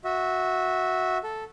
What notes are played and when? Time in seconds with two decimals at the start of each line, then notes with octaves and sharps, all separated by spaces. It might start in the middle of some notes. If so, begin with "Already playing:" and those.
0.05 F#4 E5
1.24 A4